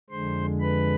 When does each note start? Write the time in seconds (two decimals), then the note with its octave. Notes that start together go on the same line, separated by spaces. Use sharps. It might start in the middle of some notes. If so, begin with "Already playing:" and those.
0.10 F2 D3 G#3 C5 C6
0.60 B4 B5